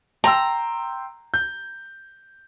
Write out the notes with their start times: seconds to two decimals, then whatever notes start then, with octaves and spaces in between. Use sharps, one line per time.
0.24 G5 A#5 C6 E6
1.34 G6